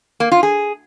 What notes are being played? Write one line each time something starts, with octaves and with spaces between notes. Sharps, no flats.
A#3
F4
G#4